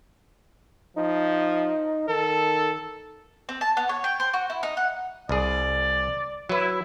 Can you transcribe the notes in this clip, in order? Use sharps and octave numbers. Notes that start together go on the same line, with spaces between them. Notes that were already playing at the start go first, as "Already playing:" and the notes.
F3 D#4
D#3 A4
C4
A5
B3
C#5
G5
C5
F#4
E4
D#4
F#5
C2 G#4 D5
F#3 E4 B4